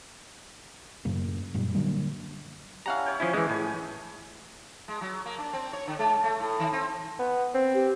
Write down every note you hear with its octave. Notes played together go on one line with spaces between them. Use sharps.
F#2 A2 C#3 A#3
F#2 A#2 G3
D3 F#3 G3 A#3
G3 C#4 E4 F5 F#5 A#5
C#5 G5
F3 C#4 E4
E3 G#3
A2 G#5 D#6
G#3
F#3
A#3
D4
C4
C#5
D3
G#3
A3
A2
D#3
C4
B3
C4
G4